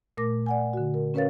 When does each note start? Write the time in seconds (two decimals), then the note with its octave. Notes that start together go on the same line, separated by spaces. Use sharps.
0.17 A#2 A3 A#4 D6 A#6
0.46 D5 F#5 G#5
0.73 D3 F#4
0.94 A#4
1.14 C#4 A#4 B4 C#5 F5 A6